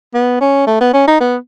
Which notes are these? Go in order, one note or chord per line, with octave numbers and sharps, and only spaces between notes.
B3
C#4
A3
B3
C#4
D#4
B3